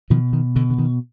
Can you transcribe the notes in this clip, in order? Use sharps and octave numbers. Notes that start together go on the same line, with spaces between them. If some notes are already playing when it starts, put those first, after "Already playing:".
B2 D#3 F3
D#3
B2 D3
D3
D#3